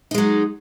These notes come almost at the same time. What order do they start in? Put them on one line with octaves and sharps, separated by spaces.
D#4 G#3 F#3